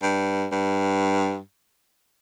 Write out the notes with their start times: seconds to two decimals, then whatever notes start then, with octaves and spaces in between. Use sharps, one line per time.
0.02 G2
0.52 G2